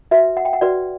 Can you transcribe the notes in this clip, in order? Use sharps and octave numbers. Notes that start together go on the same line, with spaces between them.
F#4 B4 E5
F#5
G5
F#5
F#4 B4 D5